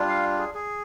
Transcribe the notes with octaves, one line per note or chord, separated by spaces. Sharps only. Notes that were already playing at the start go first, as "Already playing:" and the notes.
Already playing: G3 D4 F4
F5
G#4
G#4